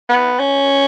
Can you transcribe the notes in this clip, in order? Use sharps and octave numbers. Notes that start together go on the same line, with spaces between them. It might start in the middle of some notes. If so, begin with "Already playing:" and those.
B3
C#4